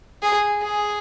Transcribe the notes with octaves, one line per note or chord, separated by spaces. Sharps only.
G#4
G#4